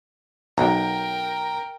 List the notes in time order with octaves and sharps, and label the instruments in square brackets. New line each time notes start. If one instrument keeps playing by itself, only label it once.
[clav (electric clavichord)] B1 [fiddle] A#4 G5 [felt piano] A#5